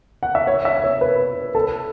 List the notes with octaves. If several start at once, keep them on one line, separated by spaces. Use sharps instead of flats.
F#5
E5
C#5
E5
C#5
B4
A4